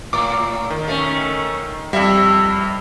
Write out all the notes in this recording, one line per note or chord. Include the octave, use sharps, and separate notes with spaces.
A2 D6
D#3
A3 C#4
F2 G3 E5